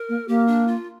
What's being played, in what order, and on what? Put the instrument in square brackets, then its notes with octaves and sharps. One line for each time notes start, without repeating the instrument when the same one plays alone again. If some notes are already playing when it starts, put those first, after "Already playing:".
Already playing: [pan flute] A#4
[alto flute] A#3
[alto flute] A#3 [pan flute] G4
[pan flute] D4
F4